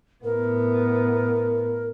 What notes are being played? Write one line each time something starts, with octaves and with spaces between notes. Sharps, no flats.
A2 B3 A#4